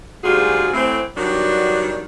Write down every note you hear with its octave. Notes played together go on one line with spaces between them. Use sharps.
D2 G#2 G3 F4 F#4 G#4
A2 E3 A3 C4
G2 D#3 F#3 B3 D4